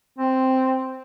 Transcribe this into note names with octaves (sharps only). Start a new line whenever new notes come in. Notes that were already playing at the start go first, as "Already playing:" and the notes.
C4